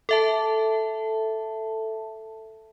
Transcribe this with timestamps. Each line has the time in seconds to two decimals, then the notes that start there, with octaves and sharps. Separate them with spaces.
0.09 A4 E5 A5